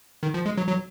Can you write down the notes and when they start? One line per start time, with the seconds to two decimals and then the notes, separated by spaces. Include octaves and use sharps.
0.23 D#3
0.34 F3
0.46 G#3
0.57 F#3
0.68 F#3